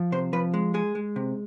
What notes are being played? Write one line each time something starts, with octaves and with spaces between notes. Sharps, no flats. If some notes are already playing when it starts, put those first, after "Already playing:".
Already playing: F3
C3 C5
F3 B4
G#3
G#3 G#4
G#3
C3